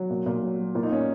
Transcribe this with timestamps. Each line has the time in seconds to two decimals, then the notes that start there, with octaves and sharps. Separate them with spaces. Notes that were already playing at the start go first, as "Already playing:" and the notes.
Already playing: F#3
0.10 A#2
0.26 A#2
0.42 F#3
0.59 F#3
0.75 A#2 F4
0.83 D#4
0.91 A#2 C#4